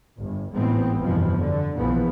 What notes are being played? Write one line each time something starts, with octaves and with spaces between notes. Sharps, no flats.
G1
G#1 A2 E3 G#3 B3 C4
G1 F2 B2 E3 F3
D3
A#1 B2 E3 F3 B3